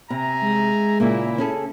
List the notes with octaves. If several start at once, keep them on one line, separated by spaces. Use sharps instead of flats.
C3 E5 G#5 A#5
G#3
A#2 C#3 A#3 E4
C#4 G#4 A4